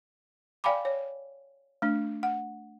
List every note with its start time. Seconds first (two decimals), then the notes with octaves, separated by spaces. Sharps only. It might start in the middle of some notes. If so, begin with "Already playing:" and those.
0.64 D5 F5 G5 G#5 B5 D6
0.85 C#5
1.82 A3 D4
2.23 F#5